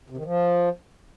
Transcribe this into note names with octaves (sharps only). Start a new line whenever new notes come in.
C3
D#3
F3